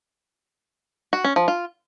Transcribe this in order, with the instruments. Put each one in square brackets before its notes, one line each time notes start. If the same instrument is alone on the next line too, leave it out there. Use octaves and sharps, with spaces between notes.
[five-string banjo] F#4
C#4
F3
F4